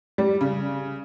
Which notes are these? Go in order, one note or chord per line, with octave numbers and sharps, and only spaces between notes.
G3
C#3